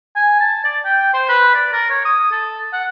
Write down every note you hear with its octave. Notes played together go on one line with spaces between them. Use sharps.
G#5
A5
D5
G5
C5
B4
D5
A#4
C#5
D#6
A4
F#5